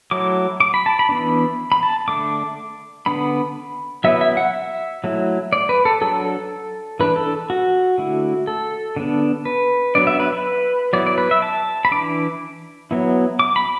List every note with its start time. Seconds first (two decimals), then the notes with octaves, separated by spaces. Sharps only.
0.11 F#3 A3 E4 D6
0.60 D6
0.74 B5
0.86 A5
0.99 B5
1.09 E3 B3 D4
1.72 B5
1.83 A5
2.08 D3 A3 D4 D6
3.06 D3 B3 D4 B5
4.04 F#3 B3 E4 E5
4.21 E5
4.37 F#5
4.53 E5
5.04 F#3 A3 E4
5.53 D5
5.69 B4
5.85 A4
6.01 F#3 D4 A4
7.00 E3 D4 B4
7.16 A4
7.50 F#4
7.98 D3 A3 E4
8.47 A4
8.96 D3 B3 D4
9.45 B4
9.95 F#3 B3 D4 D5
10.07 E5
10.20 B4
10.32 B4
10.93 F#3 B3 E4 D5
11.06 D5
11.18 B4
11.31 E5
11.42 A5
11.85 B5
11.91 E3 D4 D6
12.91 F#3 B3 E4
13.39 D6
13.56 B5